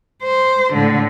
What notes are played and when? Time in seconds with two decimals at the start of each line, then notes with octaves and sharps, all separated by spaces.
0.23 C5
0.74 A2 D3